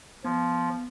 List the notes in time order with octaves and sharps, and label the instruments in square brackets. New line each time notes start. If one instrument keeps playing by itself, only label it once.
[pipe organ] F3 [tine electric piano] B3